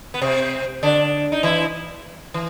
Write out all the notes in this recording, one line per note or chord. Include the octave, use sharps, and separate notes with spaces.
B3
C3 C4
D3 D4
D#4
E3 E4
E3